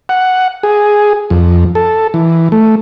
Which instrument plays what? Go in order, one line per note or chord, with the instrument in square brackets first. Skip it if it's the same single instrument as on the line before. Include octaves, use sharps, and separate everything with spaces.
[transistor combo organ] F#5
G#4
F2
A4
E3
A3